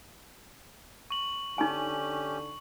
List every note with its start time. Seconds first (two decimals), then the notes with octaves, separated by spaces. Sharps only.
1.10 C#6 F#7
1.58 D3 C#4 D#4 G4 G#5